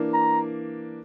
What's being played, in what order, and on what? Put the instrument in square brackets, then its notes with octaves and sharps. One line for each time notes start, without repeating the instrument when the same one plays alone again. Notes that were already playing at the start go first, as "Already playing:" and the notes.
Already playing: [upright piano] E3 A#3 D4
[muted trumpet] A#5